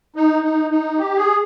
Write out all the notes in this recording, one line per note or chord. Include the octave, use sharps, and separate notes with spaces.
D#4
D#4
D#4
G4
G#4